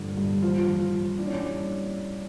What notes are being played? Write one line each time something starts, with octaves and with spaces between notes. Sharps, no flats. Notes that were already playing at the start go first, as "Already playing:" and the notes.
Already playing: G2 D3 F3
G2
F3 F4
F3
F4
F3
E3 D4
C#4
D4
G3